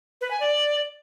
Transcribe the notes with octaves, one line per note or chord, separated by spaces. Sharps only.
B4
G#5
D5